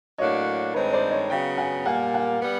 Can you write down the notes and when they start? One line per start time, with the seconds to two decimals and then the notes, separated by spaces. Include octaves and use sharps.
0.18 A2 F#3 A#3 D4 F#4 C#5 D#5
0.74 G2 D#3 G#3 C4 D#4 B4 C#5
0.93 C5 D5
1.11 C#5 D#5
1.30 C#3 F#3 B3 F5 G5
1.58 F#5 G#5
1.86 A#2 G3 A#3 F#5 G#5
2.14 F#5 G#5
2.41 G3 B3